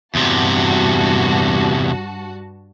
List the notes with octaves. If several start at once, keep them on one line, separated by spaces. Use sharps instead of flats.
E2 G2 C3 F#4 A5